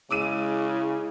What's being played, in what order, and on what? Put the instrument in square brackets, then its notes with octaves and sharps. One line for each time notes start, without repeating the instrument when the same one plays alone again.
[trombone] C#3 [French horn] G#3 [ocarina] E4 [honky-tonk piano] D6 E6 D#7